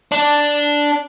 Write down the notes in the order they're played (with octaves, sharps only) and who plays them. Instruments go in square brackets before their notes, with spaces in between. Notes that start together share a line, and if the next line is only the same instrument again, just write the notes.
[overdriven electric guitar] D4